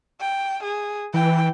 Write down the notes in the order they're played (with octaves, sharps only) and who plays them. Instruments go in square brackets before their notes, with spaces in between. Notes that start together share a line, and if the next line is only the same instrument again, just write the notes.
[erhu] G5
G#4
[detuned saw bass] E3 [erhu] G5